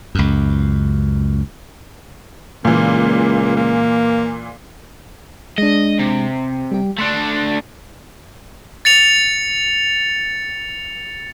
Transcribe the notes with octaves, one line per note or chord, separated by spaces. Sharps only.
C#2 F#2
C#2 A#2 E3 A#3
A#3
G#3 D4 D#5
C3
G3 G4
A3 D4 A5 C6 F#6
A6 C#7 F7